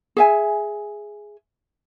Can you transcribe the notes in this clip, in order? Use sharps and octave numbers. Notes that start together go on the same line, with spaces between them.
G#4 E5 G#5